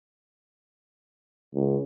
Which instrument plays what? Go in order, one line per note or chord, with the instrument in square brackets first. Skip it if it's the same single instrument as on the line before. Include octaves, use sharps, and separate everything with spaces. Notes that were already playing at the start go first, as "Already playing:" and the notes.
[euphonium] C#2